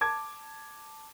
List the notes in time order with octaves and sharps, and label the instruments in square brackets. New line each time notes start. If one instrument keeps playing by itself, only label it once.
[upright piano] A5 D6 G#6